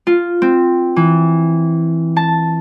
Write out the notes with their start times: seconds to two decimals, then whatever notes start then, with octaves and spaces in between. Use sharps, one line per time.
0.07 F4
0.42 C4
0.96 E3
2.17 A5